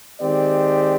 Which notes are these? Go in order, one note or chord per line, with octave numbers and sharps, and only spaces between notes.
D#3 G#3 C4 G4 D5